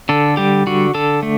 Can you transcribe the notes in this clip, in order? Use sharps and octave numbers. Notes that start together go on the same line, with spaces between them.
D3 A4
G3 G4
D3 F#4
D3 A4
A3